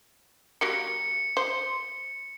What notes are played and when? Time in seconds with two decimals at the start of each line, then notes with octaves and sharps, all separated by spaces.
0.61 F#3 G3 A#3 C#7
1.37 C5